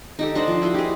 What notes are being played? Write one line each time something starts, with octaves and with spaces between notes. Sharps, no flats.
D#4 G4 A4
D4 C5 D#5 F#5
F3
E4 F#4 D#5 C6
G4 G#4